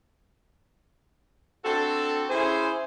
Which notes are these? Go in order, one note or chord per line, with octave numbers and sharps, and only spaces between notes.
C4 D4 F#4 A4
C#4 E4 G#4 C5